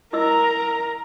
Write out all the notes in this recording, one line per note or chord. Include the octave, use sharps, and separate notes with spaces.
E4 A#4 D#5 A#5 E6